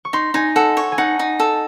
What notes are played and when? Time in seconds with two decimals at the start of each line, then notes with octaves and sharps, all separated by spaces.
0.05 C#6
0.13 D#4 C6
0.34 D#4 G#5
0.56 A4 F#5
0.77 C#5
0.92 G#5
0.98 D#4 F#5
1.19 D#4
1.40 A4